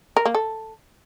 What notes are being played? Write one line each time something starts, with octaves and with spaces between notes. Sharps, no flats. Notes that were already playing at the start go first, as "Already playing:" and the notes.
A#4
A#3
A4